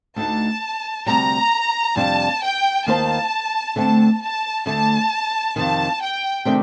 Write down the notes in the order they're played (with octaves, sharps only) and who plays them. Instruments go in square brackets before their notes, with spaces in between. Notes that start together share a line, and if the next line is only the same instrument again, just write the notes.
[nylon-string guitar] D2 D3 A3 D#4 [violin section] A5
[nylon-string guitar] D2 C3 G3 [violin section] A#5
[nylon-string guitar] F2 C3 G3 D4 [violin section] A5
[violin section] G5
[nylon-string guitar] D#2 D#3 A#3 F4 C5 [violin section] A5
[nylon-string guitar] D3 A3 C4 [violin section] A5
[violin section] A5
[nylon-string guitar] D2 D3 A3 [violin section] A5
[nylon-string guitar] F2 C3 D#3 [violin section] A5
[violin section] G5
[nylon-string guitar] C3 D#3 A3 D4 G4